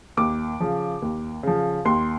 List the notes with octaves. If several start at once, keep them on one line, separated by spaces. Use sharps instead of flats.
D#2 D6
C#3 F3
D#2
C#3 F3
D#2 C6